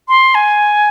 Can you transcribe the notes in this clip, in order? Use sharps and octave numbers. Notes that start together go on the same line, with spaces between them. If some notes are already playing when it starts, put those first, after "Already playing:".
C6
G#5